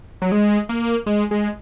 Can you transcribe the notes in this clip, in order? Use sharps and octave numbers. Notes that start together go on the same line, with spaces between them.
F#3
G#3
A#3
G#3
G#3